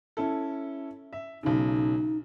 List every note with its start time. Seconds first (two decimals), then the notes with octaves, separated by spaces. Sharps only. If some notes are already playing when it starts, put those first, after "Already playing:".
0.17 C#4 E4 A4
1.13 E5
1.43 B1 C#3 D#4